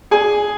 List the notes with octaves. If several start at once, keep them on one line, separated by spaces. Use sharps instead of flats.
G#4 G#5